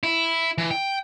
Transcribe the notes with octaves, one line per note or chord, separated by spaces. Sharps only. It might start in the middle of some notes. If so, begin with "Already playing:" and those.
E4
E3
G5